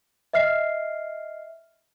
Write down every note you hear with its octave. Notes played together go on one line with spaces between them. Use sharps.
D#5 E5 F6 C7